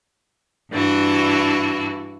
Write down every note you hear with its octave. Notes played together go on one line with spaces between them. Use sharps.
G2 E3 D4 F#4